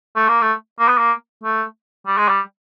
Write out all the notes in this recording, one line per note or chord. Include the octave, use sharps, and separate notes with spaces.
A3
A#3
A3
A#3
B3
A#3
A3
G3
G#3
G3